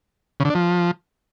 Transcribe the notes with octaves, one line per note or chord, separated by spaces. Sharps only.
C#3
D3
D4
F3